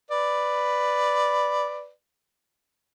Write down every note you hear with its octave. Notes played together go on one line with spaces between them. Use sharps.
B4 D5